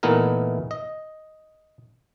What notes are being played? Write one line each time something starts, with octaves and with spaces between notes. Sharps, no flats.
A#2 E3 A3 B3 D#4 A#4
D#5